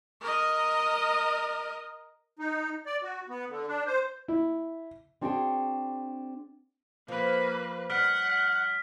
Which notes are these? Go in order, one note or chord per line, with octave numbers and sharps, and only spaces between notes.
A#4 D#5
D#4
D5
F#4
B3
D3
D4
C5
E4
C4 D4 F#4 G#4 C#5 G5
F3 A#3 B4
G3 F#5 F6 B6 D7